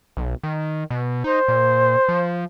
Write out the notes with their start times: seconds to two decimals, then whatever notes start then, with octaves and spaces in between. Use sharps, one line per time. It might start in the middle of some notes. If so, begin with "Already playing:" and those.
0.17 B1
0.43 D#3
0.90 B2
1.24 D#4 C5
1.48 A#2
2.09 F3